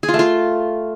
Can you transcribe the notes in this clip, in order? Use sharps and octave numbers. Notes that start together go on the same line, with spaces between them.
G#4
F4
A3
F4